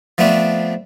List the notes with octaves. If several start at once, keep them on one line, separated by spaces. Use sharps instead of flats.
F3 A3 B3 C4 D4